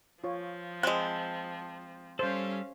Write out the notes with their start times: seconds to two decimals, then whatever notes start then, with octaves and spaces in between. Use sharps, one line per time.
0.24 F3 F4 C#5
0.83 G#3 C4 A5 B5 F#6
2.19 G3 C#4 A4 C5 F5